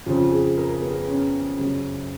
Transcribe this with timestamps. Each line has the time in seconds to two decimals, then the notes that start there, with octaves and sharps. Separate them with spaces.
0.06 F2 C#3 F4
0.32 G#4
0.58 A#4
0.83 B3
1.08 C#4
1.59 F#2 C#3